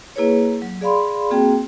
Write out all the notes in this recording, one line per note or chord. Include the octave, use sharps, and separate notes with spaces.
A#3 E4 G#4 B4 C#5
F#3
G#4 D5 F5 B5 C6
A#3 C4 F#4 G#4 G5